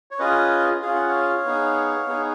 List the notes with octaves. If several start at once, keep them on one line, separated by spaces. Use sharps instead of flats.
C#5
C#4 F4 G#4 B4 D#5
C#4 F4 G#4 F5
F#5
C#5 F5
B3 D#4 G#4
B3 D#4 G#4